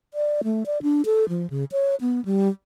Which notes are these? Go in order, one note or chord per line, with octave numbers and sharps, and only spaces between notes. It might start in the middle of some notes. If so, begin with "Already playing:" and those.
D5
A3
D5
D4
A4
F3
C#3
C#5
B3
G3